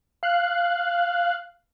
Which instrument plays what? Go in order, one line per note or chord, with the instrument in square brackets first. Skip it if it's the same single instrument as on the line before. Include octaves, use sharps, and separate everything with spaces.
[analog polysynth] F5 F#6